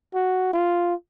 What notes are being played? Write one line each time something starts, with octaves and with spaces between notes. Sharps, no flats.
F#4
F4